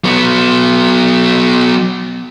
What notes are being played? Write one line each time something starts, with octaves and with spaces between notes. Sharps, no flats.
F#3 B3